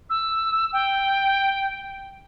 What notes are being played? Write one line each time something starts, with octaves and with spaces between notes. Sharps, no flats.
E6
G5